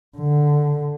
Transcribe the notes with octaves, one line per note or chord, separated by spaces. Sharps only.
D3